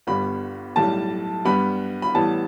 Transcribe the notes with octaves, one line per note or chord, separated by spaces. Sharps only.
G1 G2 G3 B3 B5
B1 A2 G3 A5
G2 G3 B3 B5
B5
A1 A2 G3 B3 A5